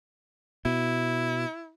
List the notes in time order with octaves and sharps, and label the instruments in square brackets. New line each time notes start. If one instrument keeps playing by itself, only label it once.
[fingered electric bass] B2 [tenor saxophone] E4